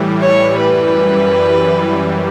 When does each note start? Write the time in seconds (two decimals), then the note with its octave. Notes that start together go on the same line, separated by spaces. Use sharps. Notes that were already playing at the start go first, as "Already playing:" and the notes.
Already playing: A2 E3 G3
0.22 C#5
0.58 F#2 E3 G3 B4